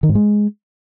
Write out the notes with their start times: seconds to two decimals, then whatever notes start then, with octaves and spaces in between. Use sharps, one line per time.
0.03 D#3
0.09 G#2
0.15 G#3